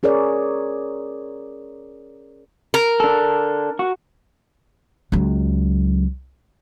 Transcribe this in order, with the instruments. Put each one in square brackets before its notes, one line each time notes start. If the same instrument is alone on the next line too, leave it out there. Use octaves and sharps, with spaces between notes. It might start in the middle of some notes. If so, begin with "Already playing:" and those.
[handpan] C#4 G#4 A#4 C#5 D5
[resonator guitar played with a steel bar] A#4
[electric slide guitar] D4 A4
F#4
[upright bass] C#2 F#3